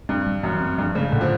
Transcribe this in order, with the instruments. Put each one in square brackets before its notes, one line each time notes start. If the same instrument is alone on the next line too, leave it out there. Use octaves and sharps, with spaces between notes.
[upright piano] G2 [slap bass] C4
[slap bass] G3
[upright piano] F#2 [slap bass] E3
[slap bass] C4
[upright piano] G2 [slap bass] F3
[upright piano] C#3 [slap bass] G#3
[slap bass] A2 [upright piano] D3
[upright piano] F3